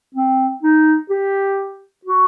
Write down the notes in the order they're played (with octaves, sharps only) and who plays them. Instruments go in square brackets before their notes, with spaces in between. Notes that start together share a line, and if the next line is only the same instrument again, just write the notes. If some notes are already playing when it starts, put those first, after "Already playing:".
[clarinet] C4
D#4
G4
F#4